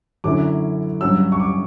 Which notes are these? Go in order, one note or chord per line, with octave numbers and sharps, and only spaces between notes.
F#2 D3 F#3 C#4 E4 D6
G2 F#3 C#4 E6
C#6
D6